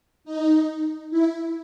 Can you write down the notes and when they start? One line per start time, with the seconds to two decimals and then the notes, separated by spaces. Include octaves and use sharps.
0.25 D#4
1.10 E4